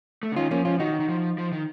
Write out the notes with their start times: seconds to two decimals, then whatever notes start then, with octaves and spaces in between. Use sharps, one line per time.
0.23 A3
0.32 C#3
0.36 D#3 C#4 F4
0.51 F3 A#3 C#4
0.65 F3 C#4 F4
0.79 D#3 D#4 F#4
1.00 D#3
1.09 F3
1.38 F3
1.52 D#3